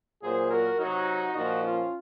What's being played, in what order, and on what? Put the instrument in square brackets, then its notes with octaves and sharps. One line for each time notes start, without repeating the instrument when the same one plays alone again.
[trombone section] A#2 F#3 G#4 C5
F#4 A#4
C3 F#3 D#4 F#4
A#2 F3 D#4 F#4
C#4 F4